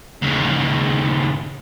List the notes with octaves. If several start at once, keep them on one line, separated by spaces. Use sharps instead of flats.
D#2 C#3